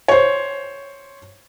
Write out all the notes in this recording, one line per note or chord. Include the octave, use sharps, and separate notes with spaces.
C5 C#5